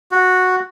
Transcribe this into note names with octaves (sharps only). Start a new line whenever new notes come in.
F#4